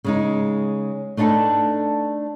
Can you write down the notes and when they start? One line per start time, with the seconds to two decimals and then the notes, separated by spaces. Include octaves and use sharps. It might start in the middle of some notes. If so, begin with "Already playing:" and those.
0.04 C#3 G#3 D#4
1.17 A3 D4 D#4 G4 A4 B4